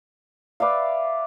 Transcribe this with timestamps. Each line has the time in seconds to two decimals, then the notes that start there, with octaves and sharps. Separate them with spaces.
0.60 B4 D5 E5 F5